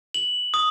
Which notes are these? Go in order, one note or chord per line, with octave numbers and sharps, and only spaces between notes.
F#7
D#6